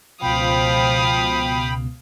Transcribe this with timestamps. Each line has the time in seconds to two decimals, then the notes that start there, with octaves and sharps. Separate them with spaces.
0.22 C#2 B2 F3 F5 G5 B5 D#6